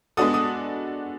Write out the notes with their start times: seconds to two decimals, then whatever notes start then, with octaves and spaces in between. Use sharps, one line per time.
0.17 G#3 B3 D4 F#4 A4 D#6
0.34 D#6